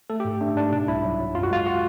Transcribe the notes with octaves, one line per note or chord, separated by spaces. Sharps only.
A3 A4
G4
G#2
A3 D4
G#2 D4
B2 D4
C2 E4
F#3
F#3
F#2 F4
F#4
G#3 F4
F#4